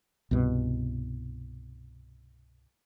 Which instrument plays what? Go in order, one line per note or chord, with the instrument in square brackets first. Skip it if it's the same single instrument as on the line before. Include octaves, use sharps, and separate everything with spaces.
[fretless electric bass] C2 G2 B2